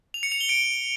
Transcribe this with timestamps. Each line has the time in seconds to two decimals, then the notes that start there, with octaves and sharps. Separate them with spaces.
0.14 F7
0.23 C#7
0.32 F7
0.41 G7
0.49 D7